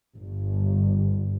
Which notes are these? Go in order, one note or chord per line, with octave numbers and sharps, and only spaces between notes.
G1